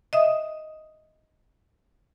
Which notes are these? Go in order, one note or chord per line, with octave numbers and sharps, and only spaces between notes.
D#5 E5 D#6